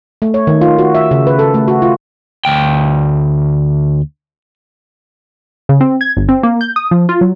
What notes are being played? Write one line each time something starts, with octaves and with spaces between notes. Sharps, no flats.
A3
C#5
D#3
F4
F#4
E5
C#3
B4
A4
A3
F#4
F4
D2 G5
C#3
C4
G#6
G1
C4
A#3
G6
D#6
F3
F4
F#3